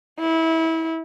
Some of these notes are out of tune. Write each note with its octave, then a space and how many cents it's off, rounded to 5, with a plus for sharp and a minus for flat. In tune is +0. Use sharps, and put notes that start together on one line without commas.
E4 -25